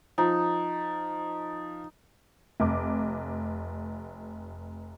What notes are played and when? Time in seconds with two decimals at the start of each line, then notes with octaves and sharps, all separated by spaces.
0.18 F3 D#4
2.60 F1 D6